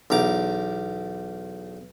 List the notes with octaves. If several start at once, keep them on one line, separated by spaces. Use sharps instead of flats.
B1 E2 A#5 D6